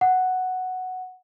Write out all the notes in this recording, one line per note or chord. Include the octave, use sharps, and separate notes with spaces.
F#5